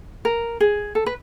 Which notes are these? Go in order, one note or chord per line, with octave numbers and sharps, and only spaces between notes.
A#4
G#4
A4
B4